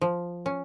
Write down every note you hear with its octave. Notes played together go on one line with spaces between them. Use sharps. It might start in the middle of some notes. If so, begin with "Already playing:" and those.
F3
C#4